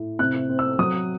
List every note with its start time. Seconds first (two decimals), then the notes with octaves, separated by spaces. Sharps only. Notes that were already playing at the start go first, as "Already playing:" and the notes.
Already playing: A2
0.19 C3 F#6
0.49 C4
0.59 E6
0.79 F#3 D#6